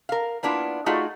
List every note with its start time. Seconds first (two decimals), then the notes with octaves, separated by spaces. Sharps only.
0.09 A#4 F5
0.43 A#3 B3 D4 E4 F4
0.86 A3 D#4 F4 F#4 G#4 D5